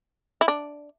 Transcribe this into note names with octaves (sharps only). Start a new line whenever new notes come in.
E4
D4